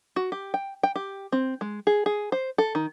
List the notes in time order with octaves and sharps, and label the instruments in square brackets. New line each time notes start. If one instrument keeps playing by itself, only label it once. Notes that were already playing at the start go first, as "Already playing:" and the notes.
[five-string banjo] F#4
G4
G5
G5
G4
C4
G#3
G#4
G#4
C5
A4
D#3